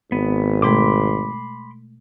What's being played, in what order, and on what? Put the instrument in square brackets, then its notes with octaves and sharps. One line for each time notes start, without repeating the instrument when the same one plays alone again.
[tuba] G#1 [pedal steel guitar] B3
[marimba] B2 G#3 A3 [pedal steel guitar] B5 C6 D6